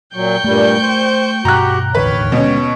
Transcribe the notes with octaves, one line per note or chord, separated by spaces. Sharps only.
A#2 F#3 G5 C#6 G6
G2 A#2 G3 A3
C5
G2 B2 F#4 G4 A#5 F#6
E1 A1 D#2 D3 B4 C#5 G5 F6
B2 D3 G#3 C#4